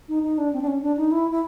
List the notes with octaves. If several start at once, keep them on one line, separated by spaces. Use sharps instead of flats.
D#4
D#4
D4
C4
D4
C#4
D4
D#4
E4
E4